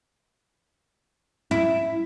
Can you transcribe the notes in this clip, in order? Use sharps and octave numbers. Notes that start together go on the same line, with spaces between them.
E4